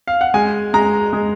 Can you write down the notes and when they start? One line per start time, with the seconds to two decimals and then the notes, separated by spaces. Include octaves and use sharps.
0.08 F5
0.21 F#5
0.34 G#3 G#5
0.74 G#3 A#5
1.13 G#3